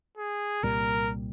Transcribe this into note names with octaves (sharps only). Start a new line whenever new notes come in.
G#4
C2 A#2 G3 A#4